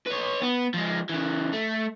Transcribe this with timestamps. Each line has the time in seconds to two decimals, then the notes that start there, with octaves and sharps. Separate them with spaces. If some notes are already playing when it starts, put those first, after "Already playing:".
0.06 B4 C#5
0.42 B3
0.74 F3 G#3
1.09 C#3 E3
1.53 A3